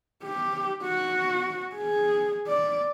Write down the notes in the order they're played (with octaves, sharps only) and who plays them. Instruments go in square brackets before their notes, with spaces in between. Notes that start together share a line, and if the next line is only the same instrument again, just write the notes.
[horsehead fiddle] G4
F#4
G#4
D5